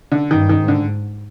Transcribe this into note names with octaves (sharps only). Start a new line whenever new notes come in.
D3
G2 D#3
D#3
G#2
D3